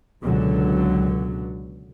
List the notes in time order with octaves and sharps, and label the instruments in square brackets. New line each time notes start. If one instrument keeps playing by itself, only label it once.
[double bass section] C#2 B2 D3 F#3